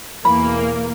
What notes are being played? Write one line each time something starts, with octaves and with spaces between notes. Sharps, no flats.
E2 B2 E3 A#3 B5